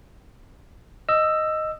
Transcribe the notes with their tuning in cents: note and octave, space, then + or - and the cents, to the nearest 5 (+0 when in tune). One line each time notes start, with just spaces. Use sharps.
D#5 +0 E6 +15